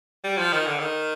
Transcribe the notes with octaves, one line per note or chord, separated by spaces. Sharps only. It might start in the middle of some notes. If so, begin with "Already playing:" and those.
G3
F3
D#3
D3
D#3